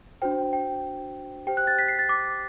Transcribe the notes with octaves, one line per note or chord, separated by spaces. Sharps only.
D4 F#4 C5 G5
G5
G4 C5 G5
F#6
A6
B6
C7
A6
D6